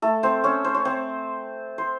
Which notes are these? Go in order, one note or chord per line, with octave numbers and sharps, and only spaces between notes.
A3 A4
C4 C5
C#4 C#5
C5
C#5
C4 C5
C5